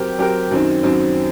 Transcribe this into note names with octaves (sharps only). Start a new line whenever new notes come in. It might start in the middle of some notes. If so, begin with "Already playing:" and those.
Already playing: F#3 C4 G4 A#4
F#3 C4 G4 A#4
F#2 D#3 F#3 C4 D#4
F#2 D#3 F#3 C4 D#4